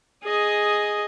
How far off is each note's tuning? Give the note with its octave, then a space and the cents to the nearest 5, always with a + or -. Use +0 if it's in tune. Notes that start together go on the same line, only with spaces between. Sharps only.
G#4 +0 D#5 +0